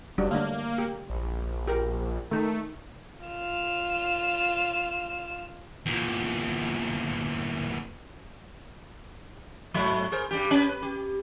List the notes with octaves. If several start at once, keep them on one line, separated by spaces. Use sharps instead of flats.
F1 F#3 G3 D4
D3 A3 A#3 D4
G4
A#1
G4 A#4
D#3 A3 D#4
F4 E7
E2 A#2
G#2 F#3 A3
G#4 A#4 C5
G2 G3 G4
C#4 G4 B4
B4
G4